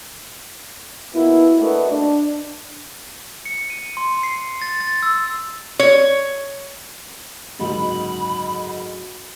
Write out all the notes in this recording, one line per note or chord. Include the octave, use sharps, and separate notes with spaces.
B2 A#3 B3 E4
A3 A#3 D4 F#4 B4 D#5
D4
C#7
D#7
C6
C7
A6
A6
E6
C#5
F#1 D2 G#2 B5